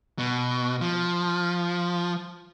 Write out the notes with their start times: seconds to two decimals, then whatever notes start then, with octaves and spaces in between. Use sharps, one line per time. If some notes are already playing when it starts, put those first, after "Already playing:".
0.19 B2
0.81 F3